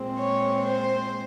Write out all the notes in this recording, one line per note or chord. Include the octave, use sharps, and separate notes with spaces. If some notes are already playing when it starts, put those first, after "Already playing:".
Already playing: A#2 G#3 C4
C#5
C5